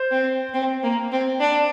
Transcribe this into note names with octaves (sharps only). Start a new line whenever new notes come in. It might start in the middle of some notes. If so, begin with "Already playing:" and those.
Already playing: C5
C4
C4
A#3
C4
D4